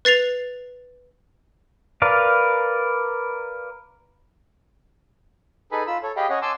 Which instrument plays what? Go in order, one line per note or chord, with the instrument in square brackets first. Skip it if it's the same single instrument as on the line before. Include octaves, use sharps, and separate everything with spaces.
[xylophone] B4 A6 C7 F7
[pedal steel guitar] A#4 B4 D5 F5
[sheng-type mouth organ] D#4 G#4 A4 B4 G#5 B5
F4 B5 E6
A4 C#5
G4 G#4 D#5 F5 G5 B5
C#4 C#5 D#5 F#5
G#5 A5 C6 D6 E6